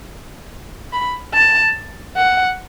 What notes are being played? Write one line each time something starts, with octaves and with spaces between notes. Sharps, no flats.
B5
A5
F#5